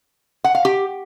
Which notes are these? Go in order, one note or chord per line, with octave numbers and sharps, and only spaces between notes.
F#5
F5
G4